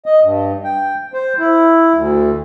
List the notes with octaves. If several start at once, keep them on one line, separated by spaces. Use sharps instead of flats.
D#5
G2
G5
C5
E4
D2